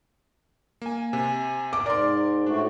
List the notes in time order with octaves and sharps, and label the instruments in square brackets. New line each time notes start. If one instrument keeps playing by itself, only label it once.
[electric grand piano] A#3 G#5
[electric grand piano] C3 [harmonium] G#5
[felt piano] D6
[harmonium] G#2 [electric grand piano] A#4 C6 [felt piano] D5
[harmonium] A2 A3 F#4 [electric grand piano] D4